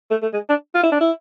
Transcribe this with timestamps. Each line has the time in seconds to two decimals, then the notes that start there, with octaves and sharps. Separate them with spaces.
0.10 A3
0.22 A3
0.33 G#3
0.49 D4
0.75 F4
0.83 E4
0.92 D4
1.00 E4